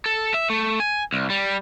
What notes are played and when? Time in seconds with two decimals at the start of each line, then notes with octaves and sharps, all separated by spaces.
0.06 A4
0.34 E5
0.50 A3
0.80 G#5
1.13 C2
1.30 G3